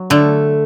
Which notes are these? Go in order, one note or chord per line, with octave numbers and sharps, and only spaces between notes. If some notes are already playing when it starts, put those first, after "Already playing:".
Already playing: F#3
D3 A3